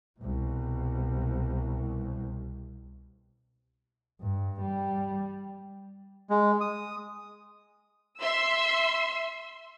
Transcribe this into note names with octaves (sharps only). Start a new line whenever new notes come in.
C2 B2
G2
G3
G#3
D#6
E5 C6 E6